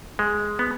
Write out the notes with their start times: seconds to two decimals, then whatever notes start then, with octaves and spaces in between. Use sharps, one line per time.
0.19 G#3
0.59 B3